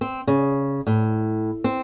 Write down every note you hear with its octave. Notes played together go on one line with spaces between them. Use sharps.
C4
C#3
A2
C4